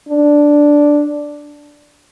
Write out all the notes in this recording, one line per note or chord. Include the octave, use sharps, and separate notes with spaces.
D4